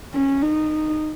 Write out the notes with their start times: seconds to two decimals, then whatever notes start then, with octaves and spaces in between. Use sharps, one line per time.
0.14 C#4
0.43 D#4